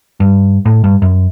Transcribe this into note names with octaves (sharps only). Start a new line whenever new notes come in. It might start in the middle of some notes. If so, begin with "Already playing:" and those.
G2
A2
G2
F#2